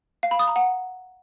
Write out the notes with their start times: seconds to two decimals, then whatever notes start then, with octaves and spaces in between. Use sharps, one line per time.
0.23 F5
0.31 B5
0.39 D#6
0.48 A#5
0.56 F#5